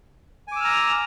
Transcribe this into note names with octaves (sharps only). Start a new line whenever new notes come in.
G#5 A#5 D6 E6 F6